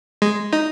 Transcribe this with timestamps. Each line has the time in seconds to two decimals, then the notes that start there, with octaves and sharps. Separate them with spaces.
0.22 G#3
0.53 D#4